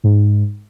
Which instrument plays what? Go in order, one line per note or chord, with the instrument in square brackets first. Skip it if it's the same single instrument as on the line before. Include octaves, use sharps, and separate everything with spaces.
[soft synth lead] G#2